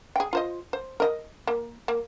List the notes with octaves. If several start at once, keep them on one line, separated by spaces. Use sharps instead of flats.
G#4 G5
F4 C5 D#5
C5
A#4 D#5
A#3
A#3